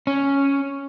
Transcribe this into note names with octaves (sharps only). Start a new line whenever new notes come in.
C#4